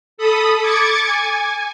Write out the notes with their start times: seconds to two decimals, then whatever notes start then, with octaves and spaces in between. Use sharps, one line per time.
0.18 A4 B5 D#6
0.61 D6 G#6 A6 C#7
1.06 G#5